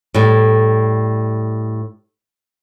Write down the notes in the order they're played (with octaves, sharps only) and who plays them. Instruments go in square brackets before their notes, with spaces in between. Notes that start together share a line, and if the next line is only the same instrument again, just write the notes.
[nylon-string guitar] A2 G3